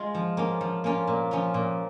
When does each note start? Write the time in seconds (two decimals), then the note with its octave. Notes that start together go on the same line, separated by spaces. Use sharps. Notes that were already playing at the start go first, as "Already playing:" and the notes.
Already playing: G#3 F4
0.14 F3
0.37 A#3 C#4 F4
0.61 F3
0.84 A#3 C#4 F4
1.07 A#2
1.31 F3 C#4 F4
1.54 A#2